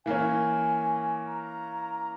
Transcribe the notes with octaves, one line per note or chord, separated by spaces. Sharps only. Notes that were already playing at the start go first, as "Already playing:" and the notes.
E3 A#3 C#4 G#5
A#5